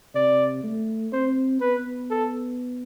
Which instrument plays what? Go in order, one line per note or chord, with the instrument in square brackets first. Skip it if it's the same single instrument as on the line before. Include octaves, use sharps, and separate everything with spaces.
[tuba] C3 [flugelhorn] D5
[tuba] A3
[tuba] C4 [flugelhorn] C5
[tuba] B3 [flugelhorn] B4
[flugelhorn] A4